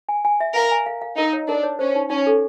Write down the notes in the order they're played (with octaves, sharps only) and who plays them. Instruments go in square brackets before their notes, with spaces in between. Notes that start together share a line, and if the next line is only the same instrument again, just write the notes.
[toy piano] G#5
G#5
E5
[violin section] A#4 [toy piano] F5
[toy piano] G#5
F5
F5
[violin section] D#4 [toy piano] A#4
[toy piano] C#5
[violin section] D4 [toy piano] A#4
[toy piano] C#5
[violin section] C#4 [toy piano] C5
[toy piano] D#4
[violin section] C#4 [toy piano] D#4
[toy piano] A4